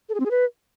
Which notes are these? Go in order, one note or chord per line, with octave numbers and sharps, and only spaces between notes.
A4
G#4
C4
G#4
B4